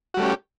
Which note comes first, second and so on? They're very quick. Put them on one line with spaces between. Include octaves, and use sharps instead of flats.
F#4 G3 A3 C#4 G4